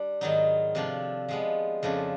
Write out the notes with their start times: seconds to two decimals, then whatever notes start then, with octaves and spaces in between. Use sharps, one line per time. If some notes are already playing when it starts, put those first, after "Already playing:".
Already playing: G3 D4
0.21 G#2 D#3 F#3 B3 D#4
0.75 C3 F3 A3 D4
1.29 F3 G#3 B3
1.83 F2 C#3 F3 A3 D4